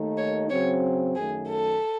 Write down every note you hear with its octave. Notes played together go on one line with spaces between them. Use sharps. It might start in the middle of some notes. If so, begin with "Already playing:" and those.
Already playing: D#2 D#3 A3 D#4
C#5
C#3 F#3 C4 C#5
F#2 D#3 A3 G#4
A4